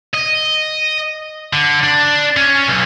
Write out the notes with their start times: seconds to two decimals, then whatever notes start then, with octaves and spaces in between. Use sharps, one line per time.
0.14 D#5
1.53 D3
1.83 D4
2.36 C#4
2.67 B1